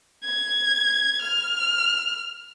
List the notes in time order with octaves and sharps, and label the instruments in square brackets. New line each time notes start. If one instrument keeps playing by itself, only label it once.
[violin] G#6
F6